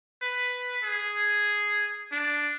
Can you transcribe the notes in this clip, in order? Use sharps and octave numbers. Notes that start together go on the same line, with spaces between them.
B4
G#4
D4